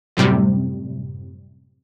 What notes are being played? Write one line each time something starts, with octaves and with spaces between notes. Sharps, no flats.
F#2 A2 C3 G3